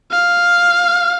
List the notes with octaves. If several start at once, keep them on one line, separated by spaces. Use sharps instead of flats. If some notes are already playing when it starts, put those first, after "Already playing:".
F5